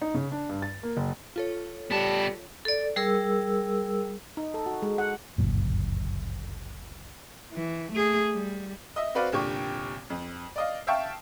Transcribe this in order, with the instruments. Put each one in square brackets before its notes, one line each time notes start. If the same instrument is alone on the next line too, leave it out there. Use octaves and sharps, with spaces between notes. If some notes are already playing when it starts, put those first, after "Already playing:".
[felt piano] D#4
C#3
D4
G2
A6
A#3
F#1
[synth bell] F4 A4 C#5
[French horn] G3 [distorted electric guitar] B3 A5
[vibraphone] A4 D5
G3 G#4 A#4 E6
[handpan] D#4
A4
F#4
G#3
F#5
[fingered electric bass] G1 C#2 F#2 A#2
[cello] E3
A3 G#4
G3
[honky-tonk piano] D#5 E5
C4 F#4 B4 D5 F5
F1 A#2 D3 G4 G5 C#6
F2
D5 D#5 F5
E5 F5 G5 A5 C#6